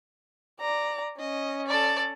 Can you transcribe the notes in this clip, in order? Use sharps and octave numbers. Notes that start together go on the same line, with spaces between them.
D5 A#5
C#4 D#5
A4 D5